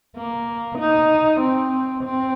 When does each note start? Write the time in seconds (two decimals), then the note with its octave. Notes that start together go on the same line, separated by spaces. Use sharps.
0.17 A#3
0.79 D#4
1.41 C4
2.04 C4